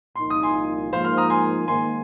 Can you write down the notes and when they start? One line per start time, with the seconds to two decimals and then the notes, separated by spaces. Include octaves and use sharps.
0.16 C2 A#2 F3 A#3 D#4 C6
0.30 D#6
0.43 G#5 C6
0.92 G#2 F3 A#3 C5 F5
1.04 C6 F6
1.17 A#5 D#6
1.30 G#5 C6
1.68 G#2 D#3 A#3 G#5 C6